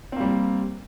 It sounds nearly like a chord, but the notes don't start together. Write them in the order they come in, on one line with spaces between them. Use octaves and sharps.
C4 A#3 G3